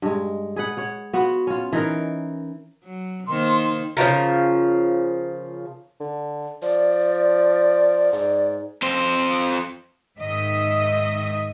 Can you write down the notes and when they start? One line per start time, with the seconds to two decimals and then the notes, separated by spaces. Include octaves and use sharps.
0.02 G2 G#3
0.56 G#4 B4 F#5
0.77 C#5 F#5
1.13 B3 F4 F#4
1.47 C#4 F4
1.73 E3 D#4 A#4
2.83 F#3
3.27 D#3 A#3 C5 C6
3.97 C#3 E3 F3 A#4
6.00 D3
6.62 F3 D5
8.13 G#2 D5
8.82 F2 C5
10.18 G#2 D#3 D#5 E5